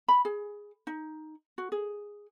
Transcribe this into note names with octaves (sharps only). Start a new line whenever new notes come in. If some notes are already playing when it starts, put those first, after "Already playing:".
B5
G#4
D#4
F#4
G#4